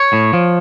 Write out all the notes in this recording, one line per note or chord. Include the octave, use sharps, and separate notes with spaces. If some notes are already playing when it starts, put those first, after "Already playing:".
Already playing: C#5
A2
F3